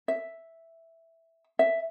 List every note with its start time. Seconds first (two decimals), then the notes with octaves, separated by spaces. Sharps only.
0.08 E5
1.59 E5